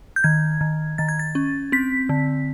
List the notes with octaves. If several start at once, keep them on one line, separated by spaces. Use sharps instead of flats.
G6
D#3 G#6
D#3
D#3 A6
G#6
A6
C#4
C4 B6
D3